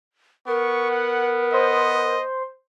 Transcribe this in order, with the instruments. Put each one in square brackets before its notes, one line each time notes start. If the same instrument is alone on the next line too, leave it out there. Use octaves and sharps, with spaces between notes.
[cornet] B3 [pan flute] A#4 [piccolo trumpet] C#6
[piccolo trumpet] F#5
[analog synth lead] C5 [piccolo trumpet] D#5